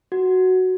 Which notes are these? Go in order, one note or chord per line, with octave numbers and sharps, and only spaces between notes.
F#4